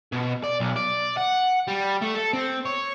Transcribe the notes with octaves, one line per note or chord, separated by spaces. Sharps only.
B2
D5
B1
D5
F#5
G3
A3
A4
C4
C#5